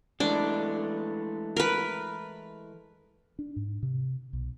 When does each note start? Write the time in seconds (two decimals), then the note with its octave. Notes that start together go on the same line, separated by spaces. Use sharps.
0.20 E3 G#3 A3 D4
1.56 A#4 B4
3.39 D4
3.56 G#2
3.82 C3
4.33 B1